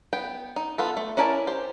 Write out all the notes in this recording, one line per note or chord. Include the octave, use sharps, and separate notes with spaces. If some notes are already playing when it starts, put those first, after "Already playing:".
B3 G5
D#4
B3 F4 A4
A3
C#4 E4 A#4 D5 A5
G4 C5